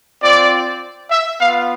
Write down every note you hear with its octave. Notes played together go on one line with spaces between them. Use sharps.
C4 F4 D5
E5
B3 F4 F5